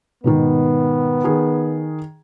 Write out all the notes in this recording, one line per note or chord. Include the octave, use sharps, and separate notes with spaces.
G#2 B2 D#3 B3
D#3 G#4